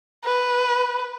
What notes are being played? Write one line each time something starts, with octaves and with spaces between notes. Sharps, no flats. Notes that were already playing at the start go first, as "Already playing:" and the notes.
B4